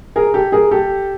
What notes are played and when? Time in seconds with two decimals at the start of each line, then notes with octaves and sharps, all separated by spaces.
0.16 G#4 A#4
0.34 G4 A4
0.52 G#4 A#4
0.71 G4 A4